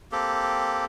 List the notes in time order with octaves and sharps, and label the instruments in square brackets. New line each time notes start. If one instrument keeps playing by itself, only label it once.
[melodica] A#3 C4 G4 A4